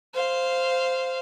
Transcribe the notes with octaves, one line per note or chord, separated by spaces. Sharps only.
C5 F5